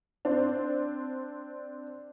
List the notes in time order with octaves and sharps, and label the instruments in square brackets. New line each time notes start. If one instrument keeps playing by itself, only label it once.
[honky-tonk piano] C4 D4